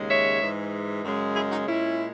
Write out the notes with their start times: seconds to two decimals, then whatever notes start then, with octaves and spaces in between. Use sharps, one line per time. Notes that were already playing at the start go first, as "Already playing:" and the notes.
Already playing: D#2 C#3 G#3
0.08 C#5 E5
0.41 G#2 E3 G#3
1.05 F#2 C#3 G#3
1.35 E4 G#4
1.51 D#4 F#4
1.67 A#2 G#3 C#4 E4